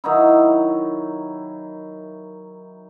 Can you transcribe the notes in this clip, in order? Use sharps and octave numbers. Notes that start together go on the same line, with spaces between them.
D#3 F#3 D#4 E4